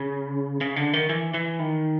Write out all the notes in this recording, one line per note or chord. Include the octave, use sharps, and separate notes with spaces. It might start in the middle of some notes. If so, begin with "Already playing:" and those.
Already playing: C#3
C#3
D3
D#3
E3
E3
D#3